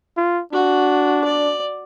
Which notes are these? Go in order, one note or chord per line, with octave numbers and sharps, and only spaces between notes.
F4
D4 F#4
D5